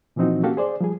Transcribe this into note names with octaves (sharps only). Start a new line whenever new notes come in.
A#2 E3 F3 C4 D#4 F#4
A#3 C#4 F#4 G4 A4 F5
G#4 C5 D5
F3 G3 G#4